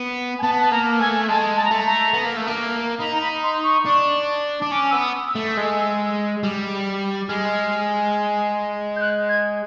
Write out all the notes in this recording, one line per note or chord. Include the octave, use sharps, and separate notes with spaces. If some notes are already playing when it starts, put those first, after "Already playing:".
Already playing: B3
G#5
B3 A5
A5
A#3 A#5
A3 G#5
G#5
G#3 A5
A5
A#5
A3 A5
A#5
B3
A#3
A3
A#3
D#4 B5
A#5
B5
C6
C#6
D4
D4
C#4 D6
B3 E6
D#6
E6
A3
G#3
G3
G#3 F6
G6
F#6
G#6